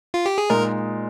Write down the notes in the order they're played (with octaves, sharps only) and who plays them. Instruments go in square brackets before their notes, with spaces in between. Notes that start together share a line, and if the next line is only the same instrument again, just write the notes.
[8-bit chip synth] F4
G4
G#4
[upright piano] A#2 G#3 D#4 [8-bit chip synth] A#4